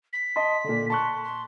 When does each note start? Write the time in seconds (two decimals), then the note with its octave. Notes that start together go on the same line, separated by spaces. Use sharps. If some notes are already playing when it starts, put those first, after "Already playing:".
0.13 B6
0.36 D#5 A5 C6
0.64 A#2 D3
0.90 A5 C6 C#6 F#6
1.24 C6